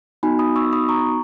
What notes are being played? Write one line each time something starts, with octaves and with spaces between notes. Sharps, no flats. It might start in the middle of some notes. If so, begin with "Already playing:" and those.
B3 D#4 F#4 G#5 B5
B5 D#6
C#6 E6
B5 D#6
A#5 C#6